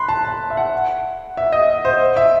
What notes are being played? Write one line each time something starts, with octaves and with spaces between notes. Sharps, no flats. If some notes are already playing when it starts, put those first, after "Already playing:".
Already playing: B5 C6 F#6
A5
A5
E5
F#5
E5
D#5
C5
E5